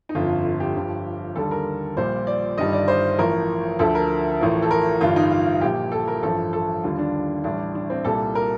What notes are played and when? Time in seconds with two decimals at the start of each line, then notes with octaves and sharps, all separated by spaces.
0.09 D#4
0.15 G1 F2 D3 F4
0.29 F4
0.45 F4
0.60 G4
0.75 G1 G2 F3
1.36 D#2 D3 G3 A4
1.51 A#4
1.97 A#1 A#2 G3 C5
2.27 D5
2.57 G1 G2 D#3 G3 D#5
2.73 D5
2.88 C5
3.18 A1 A2 F3 A#4
3.79 D2 D3 F3 A4
3.95 A#4
4.40 A1 A2 F3
4.62 A4
4.71 A#4
5.01 A1 G2 D3 G3 F4
5.16 D#4
5.31 F4
5.61 A#1 A#2 F3 G4
5.92 A4
6.08 A#4
6.23 A1 G2 F3 A4
6.53 A4
6.83 D#2 D3 G3 F4
6.99 D4
7.44 A1 A2 G3 D4
7.75 D4
7.90 C4
8.05 C2 A#2 G3 A4
8.35 A#4